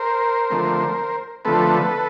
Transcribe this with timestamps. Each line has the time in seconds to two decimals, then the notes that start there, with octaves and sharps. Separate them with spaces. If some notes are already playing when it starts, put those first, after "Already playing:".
Already playing: A#4 C5
0.50 D3 F3 A3 C4
1.45 D3 F3 A3 C4 A4 B4